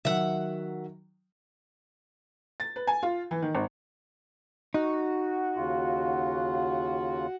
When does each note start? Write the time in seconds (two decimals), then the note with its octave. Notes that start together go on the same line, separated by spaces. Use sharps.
0.05 D#3 F#3 E5 F#5
2.60 A6
2.76 B4
2.87 G#5
3.03 F4
3.31 E3
3.42 D#3
3.55 G#1
4.74 D#4 F#4
5.56 D#2 C#3 F4